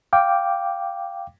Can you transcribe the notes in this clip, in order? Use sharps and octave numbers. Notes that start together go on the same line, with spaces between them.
F5 G5 D6